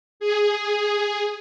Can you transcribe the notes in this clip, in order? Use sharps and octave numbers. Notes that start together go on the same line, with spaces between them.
G#4